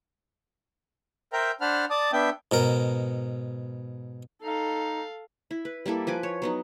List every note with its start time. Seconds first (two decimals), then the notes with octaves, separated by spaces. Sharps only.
1.33 A#4 C5 E5 G5 A#5
1.61 D4 C5 F#5 A5 B5 F6
1.90 D5 A5 D6 D#6
2.13 B3 D4 E5 G5
2.52 G#2 B2 A#4
4.42 D#4 A4 F5
5.51 E4
5.65 B4
5.86 G3 A#3 E4 A4
6.07 F3 B4 G#5 D6
6.23 C#5
6.42 F#3 B3 D#4